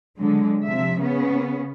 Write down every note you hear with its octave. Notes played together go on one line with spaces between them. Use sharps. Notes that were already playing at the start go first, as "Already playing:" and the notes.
D3 F#3 G#3
C3 F3 E5
C#3 B3 C#4